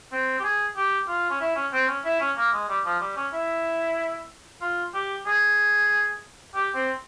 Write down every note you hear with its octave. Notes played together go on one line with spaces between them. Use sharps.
C4
G4
G#4
G4
F4
C#4
E4
C#4
C4
C#4
E4
C#4
A#3
G#3
G3
F3
G3
C#4
E4
F4
G4
G#4
G4
C4